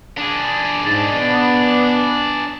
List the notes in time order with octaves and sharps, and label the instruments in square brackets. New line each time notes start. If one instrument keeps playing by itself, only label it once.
[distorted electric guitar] D4 G#4
[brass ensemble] G#2 A5
B3